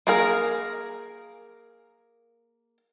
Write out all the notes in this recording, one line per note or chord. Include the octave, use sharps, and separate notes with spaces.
A#3 G#4 A#4